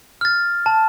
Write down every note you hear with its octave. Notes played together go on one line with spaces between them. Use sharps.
F6 A6
A5